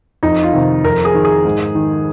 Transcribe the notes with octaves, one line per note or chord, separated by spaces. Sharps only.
F2 D#4
F4
C3 D#3
F2 A#4
G#4
D#3
G#4
G#2
D#3